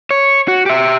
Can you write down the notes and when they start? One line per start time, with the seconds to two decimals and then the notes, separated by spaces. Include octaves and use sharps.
0.11 C#5
0.48 F#4
0.66 G4 E5